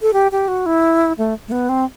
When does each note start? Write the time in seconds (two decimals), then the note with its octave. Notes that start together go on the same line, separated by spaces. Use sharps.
0.02 A4
0.13 G4
0.32 G4
0.48 F#4
0.66 E4
1.18 A3
1.48 A3
1.52 B3
1.69 C4